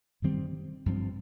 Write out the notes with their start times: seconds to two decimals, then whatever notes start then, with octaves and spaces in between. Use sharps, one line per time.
0.22 G2 D#3 G3 C4
0.86 G2 F3 C4